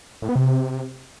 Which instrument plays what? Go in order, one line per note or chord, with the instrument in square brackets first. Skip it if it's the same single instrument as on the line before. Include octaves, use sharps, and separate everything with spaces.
[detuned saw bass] A2
B3
C3